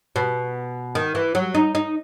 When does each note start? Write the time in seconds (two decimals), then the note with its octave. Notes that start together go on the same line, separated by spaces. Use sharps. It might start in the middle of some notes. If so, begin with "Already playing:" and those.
0.16 B2
0.95 D#3
1.15 E3
1.35 F#3
1.55 D#4
1.75 D#4